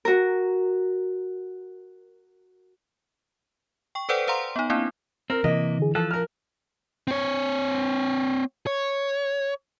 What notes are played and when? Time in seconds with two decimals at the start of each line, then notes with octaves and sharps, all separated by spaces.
0.05 F#4 A#4
3.95 G5 C#6
4.09 A4 B4 C5 D5 F#5 G5
4.27 B4 C5 F5 F#5 A#5 C6
4.56 B3 D#4
4.70 A#3 C4 D4 E4
5.30 C4 A#4
5.44 C3 E3 A#3 D#5
5.79 D3 G#4
5.95 F3 A4 F#6
6.11 A#4 F6
7.07 C4 C#5
8.67 C#5